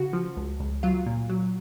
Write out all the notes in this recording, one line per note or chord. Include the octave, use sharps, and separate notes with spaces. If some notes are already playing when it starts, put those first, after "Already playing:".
Already playing: C#3 F#4
F3
C#2
C#2
F#3 F4
A#2
F#3